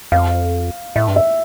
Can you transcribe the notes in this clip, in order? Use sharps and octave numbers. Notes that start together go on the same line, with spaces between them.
F2 F5
A2 E5
G2
E5